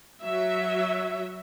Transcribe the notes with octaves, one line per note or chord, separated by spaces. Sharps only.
F#3 E5